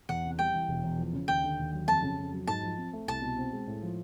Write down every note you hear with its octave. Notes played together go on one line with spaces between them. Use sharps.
E2 F#5
C3
G3 G5
E3
E1
E2
F3
C#3
D#2 G5
D3
D#2
F#3
F2 A5
C#3
F2
F#3
G#2 A5
F3
C4
A3
C2 A5
B2
C4
G#3
A2
F3